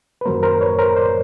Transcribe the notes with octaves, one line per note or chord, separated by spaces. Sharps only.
B4
F#2 D#3 F#3 A#3 A#4 C5
A#4 C5
B4 C#5
A#4 C5
C5 D5